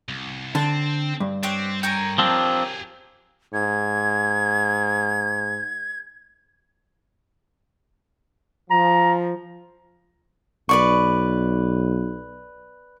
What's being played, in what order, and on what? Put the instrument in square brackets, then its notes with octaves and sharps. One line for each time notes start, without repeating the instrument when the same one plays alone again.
[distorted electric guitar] C2
[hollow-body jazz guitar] D3 [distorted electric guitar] C4 [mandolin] A5
[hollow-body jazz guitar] G2
[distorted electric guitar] C4 [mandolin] G4 C#5 F#5
[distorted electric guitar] A4 G#5 [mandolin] A#4 C#5 G5
[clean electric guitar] F3 C4 D4 [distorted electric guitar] G4 G#4
[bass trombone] G#2 [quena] G#6
[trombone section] F3 [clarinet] A#5
[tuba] B1 [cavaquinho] B4 D5 C#6